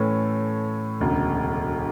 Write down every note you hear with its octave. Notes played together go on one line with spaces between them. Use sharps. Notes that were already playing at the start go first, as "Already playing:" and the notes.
Already playing: A2 E3 A3 C#4
E1 D2 C#3